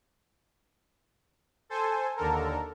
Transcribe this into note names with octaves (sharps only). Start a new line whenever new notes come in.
A4 C5 G#5
D#2 D3 A4 A#4